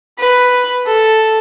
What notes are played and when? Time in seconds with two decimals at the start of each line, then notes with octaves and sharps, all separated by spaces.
0.18 B4
0.86 A4